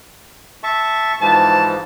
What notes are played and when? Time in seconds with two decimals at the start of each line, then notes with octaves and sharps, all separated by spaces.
0.63 E5 A5 C#6
1.21 G#2 E3 F3 A5